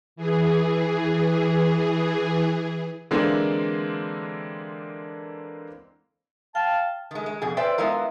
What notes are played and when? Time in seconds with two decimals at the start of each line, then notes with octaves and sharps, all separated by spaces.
0.16 E3 G#4
3.11 D3 E3 G#3 A#3 C4 D4
6.55 F5 G5 A5
7.11 D#3 G#3
7.26 G#3
7.42 F2 B2 G#4
7.57 B4 C5 D5 E5 G5
7.78 G#3 B3 E4 F4 A#4